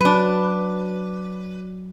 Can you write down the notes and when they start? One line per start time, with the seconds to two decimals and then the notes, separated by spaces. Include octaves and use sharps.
0.01 F#3 D4 B4